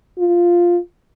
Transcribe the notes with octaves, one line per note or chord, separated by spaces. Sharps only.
F4